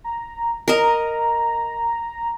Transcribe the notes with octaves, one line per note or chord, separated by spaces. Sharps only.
A#5
A#4 D#5 A#5